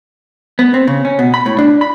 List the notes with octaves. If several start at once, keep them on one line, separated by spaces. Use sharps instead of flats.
B3
C4
C#3
C#4
B2
B5
A2
D4
B5